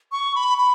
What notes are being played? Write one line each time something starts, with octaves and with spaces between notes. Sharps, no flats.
C#6
B5
B5